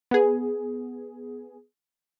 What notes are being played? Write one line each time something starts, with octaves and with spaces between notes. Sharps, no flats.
B3 G#4